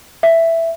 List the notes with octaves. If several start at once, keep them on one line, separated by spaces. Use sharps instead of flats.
E5